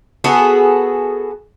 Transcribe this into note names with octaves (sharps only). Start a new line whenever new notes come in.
B3 F#4 G#4 A4